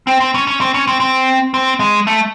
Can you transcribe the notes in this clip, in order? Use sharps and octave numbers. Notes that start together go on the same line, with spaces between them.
C4
C4
C#4
C#4
C4
C#4
C4
C4
C4
G#3
A3